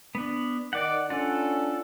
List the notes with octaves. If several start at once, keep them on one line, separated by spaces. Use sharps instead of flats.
B3 D4
D#3 D5 F#5 D6
C#4 D4 F4 A4 D5 F#5